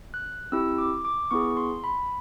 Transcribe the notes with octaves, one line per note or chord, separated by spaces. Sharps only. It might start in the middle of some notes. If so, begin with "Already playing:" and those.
F#6
C4 E4 G4 E6
D6
D6
B3 E4 G#4 C#6
C6
B5